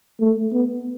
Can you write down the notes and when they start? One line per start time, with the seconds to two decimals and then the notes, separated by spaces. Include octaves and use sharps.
0.20 A3
0.53 B3